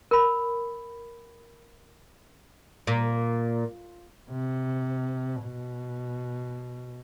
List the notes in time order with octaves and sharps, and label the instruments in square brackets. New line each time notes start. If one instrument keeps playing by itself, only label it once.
[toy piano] A#4 B5
[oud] A#2
[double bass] C3
B2